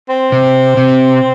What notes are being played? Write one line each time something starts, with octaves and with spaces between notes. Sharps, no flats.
C4
C3
C3